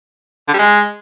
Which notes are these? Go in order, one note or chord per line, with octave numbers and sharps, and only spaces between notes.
D3
G3
G#3